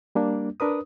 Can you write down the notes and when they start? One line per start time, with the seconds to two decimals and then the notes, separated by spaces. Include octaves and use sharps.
0.15 G3 A#3 D4
0.60 D4 A#4 B4 D#6